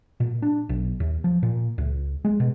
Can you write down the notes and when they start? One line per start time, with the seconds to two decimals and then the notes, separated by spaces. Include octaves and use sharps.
0.20 A#2
0.42 D4
0.69 B1
1.00 D#2
1.24 F3
1.43 A#2
1.78 C#2
2.25 G#3
2.40 B2